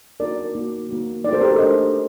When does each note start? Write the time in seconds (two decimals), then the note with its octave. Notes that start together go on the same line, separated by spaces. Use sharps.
0.20 A#3 D#4 F#4 A#4 D5
0.55 A#3 D#4 F#4
0.89 A#3 D#4 F#4
1.24 A#3 D#4 F#4 A#4 D5
1.33 A4 C5
1.41 G4 A#4
1.51 A4
1.59 A3 D4 G4 C5 D#5